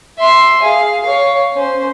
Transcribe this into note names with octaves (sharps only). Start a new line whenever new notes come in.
E5 C6
G#4 F5
C#5 F5
C#4 C5